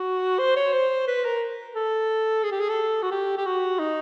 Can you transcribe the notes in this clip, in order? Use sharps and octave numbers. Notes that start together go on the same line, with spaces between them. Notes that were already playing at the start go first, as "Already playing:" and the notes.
Already playing: F#4
C5
C#5
C5
B4
A#4
A4
G#4
G4
G#4
A4
F#4
G4
G4
F#4
D#4